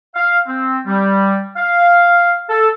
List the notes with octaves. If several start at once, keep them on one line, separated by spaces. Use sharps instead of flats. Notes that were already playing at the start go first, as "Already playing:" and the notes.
F5
C4
G3
F5
A4